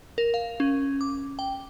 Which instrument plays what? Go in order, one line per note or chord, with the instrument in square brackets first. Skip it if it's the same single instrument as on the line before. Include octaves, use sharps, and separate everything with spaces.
[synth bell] A#4
F5
C#4
D6
G5